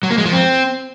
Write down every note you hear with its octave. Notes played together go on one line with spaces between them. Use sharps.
F#3
A#3
G#3
F3
C4